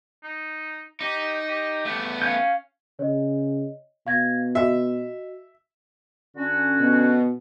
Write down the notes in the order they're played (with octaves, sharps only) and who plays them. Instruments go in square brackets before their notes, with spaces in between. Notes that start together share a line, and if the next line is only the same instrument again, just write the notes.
[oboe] D#4
[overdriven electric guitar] D#4 [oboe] G4
[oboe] G4
[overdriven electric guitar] A3 B3
[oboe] C#4 [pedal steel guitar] F5 G6
[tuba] C#3 [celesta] C#5 D#5
[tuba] B2 [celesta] F5 G#6 A#6
[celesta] F#4 D#5 [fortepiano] E5
[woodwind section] D3 C#4 F#4
[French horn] B2